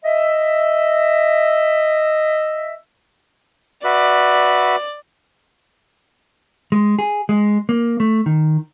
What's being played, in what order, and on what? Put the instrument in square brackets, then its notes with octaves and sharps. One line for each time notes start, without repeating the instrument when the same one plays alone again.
[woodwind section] D#5 E5
[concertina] F#4 B4 E5 [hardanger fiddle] D5
[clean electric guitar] G#3
G#4
G#3
A#3
A3
D#3